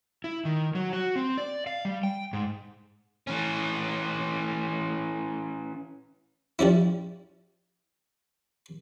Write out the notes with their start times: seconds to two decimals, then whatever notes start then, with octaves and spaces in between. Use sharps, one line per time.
0.24 E4
0.45 D#3
0.75 F#3
0.93 F#4
1.16 C4
1.38 D5
1.67 F5
1.85 G3
2.03 G5
2.33 G#2
3.27 E3 C#4
6.59 F3 G3 C#4 E4